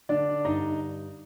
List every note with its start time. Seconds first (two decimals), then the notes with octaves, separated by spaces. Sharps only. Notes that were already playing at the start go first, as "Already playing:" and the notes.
0.09 D3 D4 D5
0.45 G2 D#4 D#5